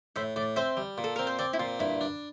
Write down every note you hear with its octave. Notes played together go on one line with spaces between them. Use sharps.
A2 C5 E5
A2 D5
C4 C5 E5
G3
A#2
A4
C4 A#4
C5
C4 D5
E4
A#2 F4
G2 E4
D4